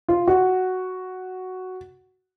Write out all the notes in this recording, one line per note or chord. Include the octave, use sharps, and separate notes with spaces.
F4
F#4